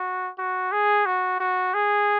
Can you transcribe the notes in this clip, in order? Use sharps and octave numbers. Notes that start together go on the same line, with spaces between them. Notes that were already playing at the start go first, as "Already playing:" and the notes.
Already playing: F#4
F#4
G#4
F#4
F#4
G#4